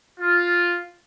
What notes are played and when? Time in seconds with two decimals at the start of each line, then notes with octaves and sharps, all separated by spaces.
0.20 F4